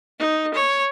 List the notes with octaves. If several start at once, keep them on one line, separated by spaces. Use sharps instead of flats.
D#4
C#5